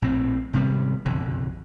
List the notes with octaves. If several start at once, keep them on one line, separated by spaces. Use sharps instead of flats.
A#1 A2 C4
G#1 C3 G3 B3
F#1 B1 F2 D3